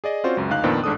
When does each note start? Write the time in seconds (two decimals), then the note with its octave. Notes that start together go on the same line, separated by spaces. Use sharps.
0.04 G#4 D5 D#5
0.24 C4 C#4 F4 F#4 C5 D5
0.37 C#2 F#2
0.50 D2 D#4 F5 F#6
0.63 F2 A#2 D#3 B3 C4 D4
0.84 A1 G#2 D4 A4 D#6